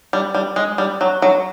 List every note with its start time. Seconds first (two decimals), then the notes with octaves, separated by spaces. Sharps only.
0.13 G3
0.34 G3
0.56 G#3
0.78 G3
1.01 F#3
1.22 F#3